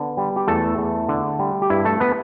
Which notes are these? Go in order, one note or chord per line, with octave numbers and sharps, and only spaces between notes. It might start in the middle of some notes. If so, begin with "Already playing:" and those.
Already playing: D3 B3 B4
G3
G4
E2 A3 A4
E2
D3
G3
G4
G2 E4
A3 A4
B3 B4